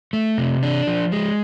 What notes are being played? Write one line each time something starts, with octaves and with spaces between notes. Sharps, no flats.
A3
C3
D4
F3
G#3